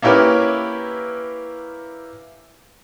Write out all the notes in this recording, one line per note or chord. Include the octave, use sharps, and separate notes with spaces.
A#3 C#4 E4 G4 A#4 B4